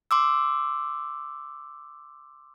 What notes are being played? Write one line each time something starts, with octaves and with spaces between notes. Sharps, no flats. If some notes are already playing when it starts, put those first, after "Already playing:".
C6 D6 E6